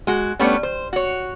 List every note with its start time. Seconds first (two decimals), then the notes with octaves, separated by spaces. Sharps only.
0.07 G#3 F#4
0.39 G3 A3 B3 C#4 D4
0.63 C5
0.93 F#4 C#5